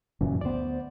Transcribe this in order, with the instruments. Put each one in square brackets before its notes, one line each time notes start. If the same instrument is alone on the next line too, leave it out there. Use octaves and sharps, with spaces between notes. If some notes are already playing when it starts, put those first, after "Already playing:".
[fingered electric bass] F1 C#3 [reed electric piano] F#2 A#2 E3
[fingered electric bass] D2 B3 [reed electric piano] C5 D5